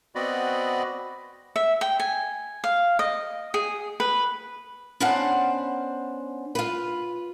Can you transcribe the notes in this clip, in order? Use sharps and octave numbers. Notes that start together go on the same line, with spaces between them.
B3 C4 F#4 D5 D#5 B5
E5
G5
G#5
F5
D#5
G#4
B4
B3 C#4 D4 C5 F5 F#5
F4 B4